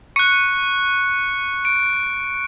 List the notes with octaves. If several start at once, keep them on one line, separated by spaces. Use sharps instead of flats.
C#6 F#6 C#7
D7